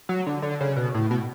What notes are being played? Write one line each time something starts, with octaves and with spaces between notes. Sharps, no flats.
F#3
D3
D3
C#3
B2
A2
B2